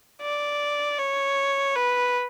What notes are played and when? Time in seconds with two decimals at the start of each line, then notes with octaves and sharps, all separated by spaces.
0.21 D5
0.98 C#5
1.76 B4